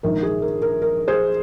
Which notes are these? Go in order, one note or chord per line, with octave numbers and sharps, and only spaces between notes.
A#1 G#2 D#3 A#4
G#4
A#4
A#4
A#4
G#4 C5